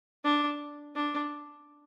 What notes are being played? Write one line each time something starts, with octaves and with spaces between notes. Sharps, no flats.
D4
D4